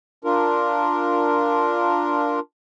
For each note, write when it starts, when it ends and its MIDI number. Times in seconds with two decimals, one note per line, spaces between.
0.24 2.40 62
0.24 2.40 65
0.24 2.40 70